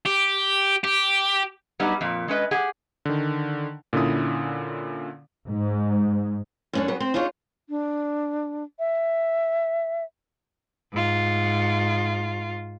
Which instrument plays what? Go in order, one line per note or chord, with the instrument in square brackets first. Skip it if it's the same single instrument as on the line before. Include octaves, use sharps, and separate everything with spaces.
[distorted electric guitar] G4
G4
[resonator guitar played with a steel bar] F#3 G3 B3 D#4
F2 A#2
G#3 C#4 B4 D#5
G4 G#4 F#5
[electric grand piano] D3 D#3
A#2 D3 C#4 E4 D#6
[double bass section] G#2
[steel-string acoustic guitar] F#2 C#4 D4
G2 F#3 B3 G#4
C4 C5
D4 D#4 F4 G#4 C#5
[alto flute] D4
E5
[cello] G#2 F4